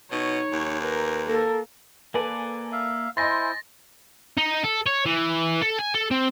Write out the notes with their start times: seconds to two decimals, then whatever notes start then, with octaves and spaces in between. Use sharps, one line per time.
0.12 B2 D#4 C#5
0.53 D#2
0.82 A#4 B4
1.27 A#3 A4 A#4
2.14 A#3 A4 B4 D5 G#5
2.72 E5 F5
3.17 E4 C5 D#5 G#5 C6 A6 A#6
4.37 D#4
4.64 A4
4.86 C#5
5.06 E3
5.62 A4
5.79 G#5
5.95 A4
6.11 C4